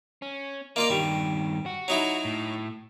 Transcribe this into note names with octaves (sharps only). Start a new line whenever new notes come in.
C#4
A#3 F4 D5 D#5
G2 D#3 G3
F#4
F#3 D#4 E4
A2